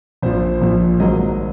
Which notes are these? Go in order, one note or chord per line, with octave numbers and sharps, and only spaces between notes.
A#1 A#2 F3 C5
A#1 A#2 F3
G#1 G#2 F#3 A#3 D#5